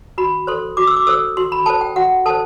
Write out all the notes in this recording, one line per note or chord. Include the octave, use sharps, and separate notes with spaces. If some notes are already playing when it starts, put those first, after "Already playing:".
F#4 B5
A4 C5 C6
F#4 D6
E6
D6
A4 C5 E6
F#4 C6
B5
A4 C5 A5
G5
F#4 F#5
A4 C5 A5